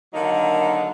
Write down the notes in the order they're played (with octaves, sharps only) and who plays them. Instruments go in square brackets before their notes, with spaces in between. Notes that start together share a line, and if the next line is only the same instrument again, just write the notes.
[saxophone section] D3 D#3 F#3 A#3 D#4